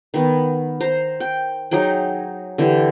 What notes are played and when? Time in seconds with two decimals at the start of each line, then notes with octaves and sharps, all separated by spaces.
0.14 D#3 B3
0.80 C5 A#5
1.20 G5
1.71 F#3 D#4 G#4 G5
2.58 D3 E3 G4